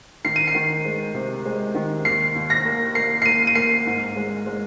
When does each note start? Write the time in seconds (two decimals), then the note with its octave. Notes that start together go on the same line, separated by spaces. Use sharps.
0.24 D#3 C7
0.36 D#7
0.47 C7
0.55 D#3
0.85 G#3
1.14 C3
1.45 G#3
1.75 D#3
2.05 D#2 C7
2.35 D#2
2.50 A#6
2.65 A#3
2.95 A#3 C7
3.22 C7
3.25 A#3 D#7
3.47 D#7
3.55 A#3 C7
3.86 G#2
4.16 G#3
4.46 G#3